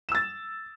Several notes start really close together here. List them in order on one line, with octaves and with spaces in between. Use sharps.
E7 E6 A6